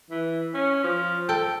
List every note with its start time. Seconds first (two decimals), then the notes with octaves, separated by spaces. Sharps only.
0.11 E3
0.54 C#4
0.84 F3
1.29 A4 G5